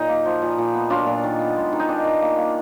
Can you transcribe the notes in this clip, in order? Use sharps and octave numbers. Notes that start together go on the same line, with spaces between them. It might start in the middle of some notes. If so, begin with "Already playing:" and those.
Already playing: A#2 F#3 D#4
A#3
F3
A#2
A#2
B3
F#3 D4 F4
A#2
D#3
B3
G#3
D#3
D#4
D#3 D4
D#3
A#3
A#3